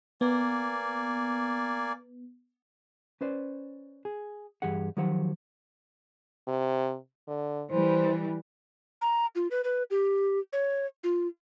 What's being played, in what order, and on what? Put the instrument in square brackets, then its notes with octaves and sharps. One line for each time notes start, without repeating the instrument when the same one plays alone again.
[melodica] A#3 D5 G#5 [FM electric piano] B3
[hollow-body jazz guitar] C#4 B4 C5 D5
G#4
G2 E3 G4 G#4 F#5
D#3 F3 F#3 G4 C5 F#5
[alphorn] C3
D3
[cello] E3 G3 [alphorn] C5
[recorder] A#5
F4
B4
B4
G4
C#5
F4